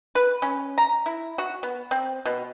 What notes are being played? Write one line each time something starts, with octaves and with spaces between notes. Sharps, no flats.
B4
C#4
A#5
E4
F#4
B3
C4
B2